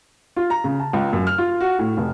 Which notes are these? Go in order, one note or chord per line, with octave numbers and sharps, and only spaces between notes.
F4
A#5
C#3
A5
C#2
F#2
F6
F4
F#4
A2
F1